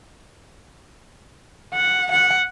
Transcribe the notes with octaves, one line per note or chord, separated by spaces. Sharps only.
F#5
F#5